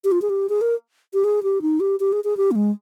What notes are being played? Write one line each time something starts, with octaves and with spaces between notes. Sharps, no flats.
G4
F4
G#4
G4
G#4
A#4
G4
G#4
G4
D#4
G4
G4
G#4
G#4
G4
A#3
G#3